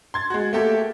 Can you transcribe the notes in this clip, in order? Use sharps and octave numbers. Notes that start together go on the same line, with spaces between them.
C6 G#6 A6
G#3 F#4
A3 A#3 G4 A4